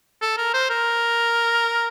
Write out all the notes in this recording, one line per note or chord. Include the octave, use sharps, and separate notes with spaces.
A4
A#4
C5
A#4